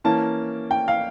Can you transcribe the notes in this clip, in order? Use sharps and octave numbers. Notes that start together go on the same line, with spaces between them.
E3 A#3 C#4 A5
G5
F5